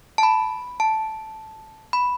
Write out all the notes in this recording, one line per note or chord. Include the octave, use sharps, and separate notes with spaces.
A5
B5
A5
B5